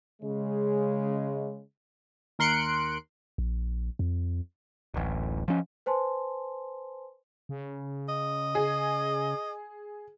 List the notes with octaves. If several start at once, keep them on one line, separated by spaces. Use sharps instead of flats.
C#3 G#3
D#2 A#4 C6 F#6 C#7 D7
A#1
F2
D1 A1
F3 C#4
B4 C5 G#5 A5 C6
C#3
D#5
G#4